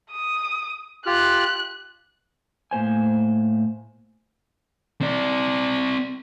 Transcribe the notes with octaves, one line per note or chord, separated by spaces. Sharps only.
D#6
F4 G4 F6 F#6
A2 A#3 C5 G#5
C4 D5